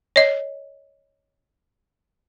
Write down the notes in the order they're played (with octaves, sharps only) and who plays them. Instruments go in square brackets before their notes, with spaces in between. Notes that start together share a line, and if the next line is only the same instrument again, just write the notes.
[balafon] C#5 D#5